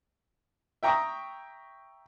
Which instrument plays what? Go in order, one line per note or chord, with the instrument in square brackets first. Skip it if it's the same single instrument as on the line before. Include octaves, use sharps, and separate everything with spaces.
[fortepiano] E5 G5 A#5 C#6 D#6